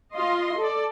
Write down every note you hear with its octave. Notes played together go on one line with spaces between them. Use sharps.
F4 D#5 C6
A4 D5